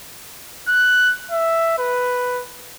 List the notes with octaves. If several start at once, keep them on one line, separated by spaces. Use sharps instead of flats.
F#6
E5
B4